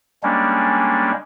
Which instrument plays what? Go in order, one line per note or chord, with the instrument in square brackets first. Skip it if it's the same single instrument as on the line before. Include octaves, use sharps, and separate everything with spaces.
[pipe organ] G3 G#3 A#3 C#4 D4